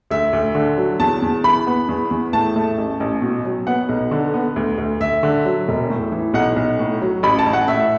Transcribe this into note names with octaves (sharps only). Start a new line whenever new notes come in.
D2 E5
D2
D3
F#3
E2 A5
E2
E3 B5
B3
E2
E2
A2 A5
A3
A1
A1
B2
F#3
B3 F#5
B1
D3
B3
D2
D2
D2 E5
D3
F#3
E1
A2
E3
B1 F#5
B1
A2
F#3
A1 B5
A5
A1
F#5
A2 E5